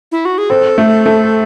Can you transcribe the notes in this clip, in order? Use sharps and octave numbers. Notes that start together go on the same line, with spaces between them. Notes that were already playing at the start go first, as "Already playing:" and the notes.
E4
F#4
G#4
C4 A4
A3
A3